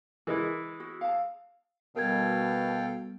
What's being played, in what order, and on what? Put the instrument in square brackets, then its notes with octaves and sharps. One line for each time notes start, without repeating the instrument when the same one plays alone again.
[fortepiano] E3 G#3 E4 [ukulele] A#4
[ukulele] F#4
F5 A5
[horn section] B2 [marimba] G3 B3 [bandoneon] A4 F5 G5 [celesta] A#4 G#6